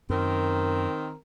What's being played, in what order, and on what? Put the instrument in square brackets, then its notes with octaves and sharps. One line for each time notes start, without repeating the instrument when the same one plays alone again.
[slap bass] F#2 [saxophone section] D#3 C4 A#4